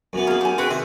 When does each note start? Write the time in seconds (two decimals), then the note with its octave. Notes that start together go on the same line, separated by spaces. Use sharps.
0.13 F#2 E3 B3
0.27 A#3 G#4
0.41 G4 G#5
0.58 C4 F#4 G#4 B4 G5
0.70 C3 D#3 E5